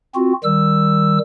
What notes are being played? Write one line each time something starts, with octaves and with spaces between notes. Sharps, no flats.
C4 F4 F#4
D#3 G3 E6